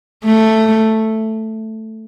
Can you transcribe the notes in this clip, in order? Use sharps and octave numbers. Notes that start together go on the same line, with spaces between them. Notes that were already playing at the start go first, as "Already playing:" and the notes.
A3